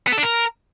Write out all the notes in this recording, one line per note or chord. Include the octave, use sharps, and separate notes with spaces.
B3
A4
D4
A#4